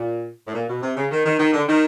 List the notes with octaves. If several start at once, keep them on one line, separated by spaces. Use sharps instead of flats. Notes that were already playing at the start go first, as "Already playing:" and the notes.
Already playing: A#2
A2
A#2
B2
C3
C#3
D#3
D#3
D#3
D3
D#3